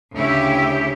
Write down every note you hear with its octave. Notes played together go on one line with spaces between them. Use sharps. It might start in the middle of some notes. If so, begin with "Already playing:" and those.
D2 C#3 E4 G4